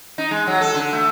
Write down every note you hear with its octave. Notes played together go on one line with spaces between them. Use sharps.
D#4
G#3
F#3
A4
D3
A3